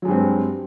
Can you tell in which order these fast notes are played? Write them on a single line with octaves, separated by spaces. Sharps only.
F#3 G#3 G2 C4